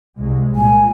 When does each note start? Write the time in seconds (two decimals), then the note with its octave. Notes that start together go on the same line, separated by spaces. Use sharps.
0.20 C2 G#3
0.55 A#2 G#5